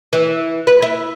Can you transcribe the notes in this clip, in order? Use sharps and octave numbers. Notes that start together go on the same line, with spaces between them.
E3
B4
E4